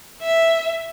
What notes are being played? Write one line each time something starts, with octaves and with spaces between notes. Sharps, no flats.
E5